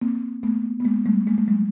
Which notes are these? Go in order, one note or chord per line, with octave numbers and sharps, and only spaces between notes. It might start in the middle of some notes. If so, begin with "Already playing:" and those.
A#3 C4
A3 B3
B3
G#3 A#3
G3 A3
G#3 A#3
A3
F#3 G#3